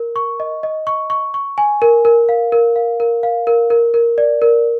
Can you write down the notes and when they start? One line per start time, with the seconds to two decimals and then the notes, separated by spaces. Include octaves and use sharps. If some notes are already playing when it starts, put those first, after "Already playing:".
Already playing: A#4
0.16 C#6
0.40 D#5
0.63 D#5
0.87 C#6
1.10 C#6
1.34 C#6
1.58 G#5
1.82 A#4
2.05 A#4
2.29 F5
2.52 A#4
2.76 F5
3.00 A#4
3.23 F5
3.47 A#4
3.70 A#4
3.94 A#4
4.18 D5
4.42 A#4